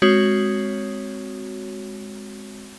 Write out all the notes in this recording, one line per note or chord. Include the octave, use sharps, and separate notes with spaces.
G#3 C4 F#4 C#5